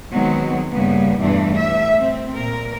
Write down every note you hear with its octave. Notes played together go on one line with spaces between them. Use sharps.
D#3 F#3 G#3 B3 C4
G2 C#3 A#3 B3
E2 G2 B2 E3 A3 D4
A2 E5
C4
A#2 A#4